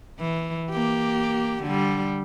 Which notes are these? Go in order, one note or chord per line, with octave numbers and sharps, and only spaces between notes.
E3
A#3 G4
D3 G3